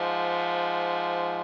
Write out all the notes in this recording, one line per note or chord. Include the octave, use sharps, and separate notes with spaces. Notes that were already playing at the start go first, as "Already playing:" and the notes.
Already playing: G#2 F3